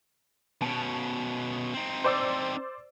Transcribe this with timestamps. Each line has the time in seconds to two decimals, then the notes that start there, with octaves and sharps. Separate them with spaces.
0.62 B2 C#4 A5 D7
1.74 C4 D#4
2.04 C5 D5 E6